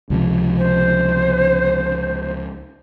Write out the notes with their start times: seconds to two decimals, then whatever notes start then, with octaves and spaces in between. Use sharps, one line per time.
0.10 C#2 C3 F3
0.57 C5